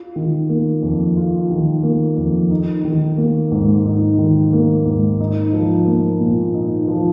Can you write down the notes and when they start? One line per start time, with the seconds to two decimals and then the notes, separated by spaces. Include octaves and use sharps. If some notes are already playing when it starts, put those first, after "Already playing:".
Already playing: F4
0.16 D#3
0.49 A#3
0.83 F2
1.17 F4
1.50 D#3
1.83 A#3
2.17 F2
2.51 D#4
2.84 D#3
3.18 A#3
3.52 G#2
3.85 D#4
4.18 D#3
4.53 A#3
4.86 G#2
5.20 D#4
5.53 F3
5.87 A#3
6.20 A#2
6.54 D#4
6.88 F3